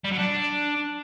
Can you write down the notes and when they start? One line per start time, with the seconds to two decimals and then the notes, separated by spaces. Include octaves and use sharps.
0.04 G3
0.11 F#3
0.18 D4